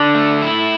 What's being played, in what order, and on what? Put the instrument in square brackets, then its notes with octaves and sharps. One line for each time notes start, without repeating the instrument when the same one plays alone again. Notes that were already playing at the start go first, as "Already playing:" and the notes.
Already playing: [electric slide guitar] D3 [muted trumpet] D4
[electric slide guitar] A3
E4